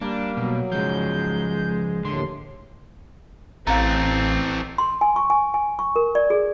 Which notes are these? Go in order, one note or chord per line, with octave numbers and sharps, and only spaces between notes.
G3 A#3 D4
B2 F#3
C#3 F3 G#3 G6
D#2 A2 D3 C6
A1 E3 A3 C4 F5 A#5
C6
G#5
C#6
G#5
G#5
C#6
A#4
D5
G#4